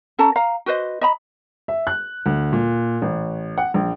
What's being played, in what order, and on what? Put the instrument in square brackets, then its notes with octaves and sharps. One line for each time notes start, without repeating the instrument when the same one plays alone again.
[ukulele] C#4 A4 A5 A#5
F5 A#5
F#4 B4 C5 D#5
D#5 A#5 B5
[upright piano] E5
F#6
D2
A#2
A1
F#5
A#1